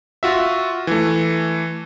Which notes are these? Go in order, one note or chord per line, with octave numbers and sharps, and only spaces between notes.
F4 F#4 E5
E3 A3